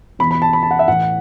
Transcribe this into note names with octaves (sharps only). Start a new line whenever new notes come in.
E2 B2 B5
B5
A5
B5
A5
F#5
E5
A2 E3 F#5